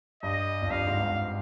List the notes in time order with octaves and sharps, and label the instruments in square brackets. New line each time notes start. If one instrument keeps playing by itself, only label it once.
[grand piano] G2 [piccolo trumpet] D#5
[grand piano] F2
[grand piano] G2 [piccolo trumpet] F5
[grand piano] G#2
G2